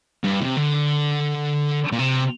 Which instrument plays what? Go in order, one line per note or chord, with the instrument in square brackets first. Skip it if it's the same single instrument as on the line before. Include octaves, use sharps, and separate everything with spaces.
[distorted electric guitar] G2
C3
D3
A#2
C3